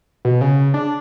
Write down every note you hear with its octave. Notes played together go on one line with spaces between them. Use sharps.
B2
C#3
D4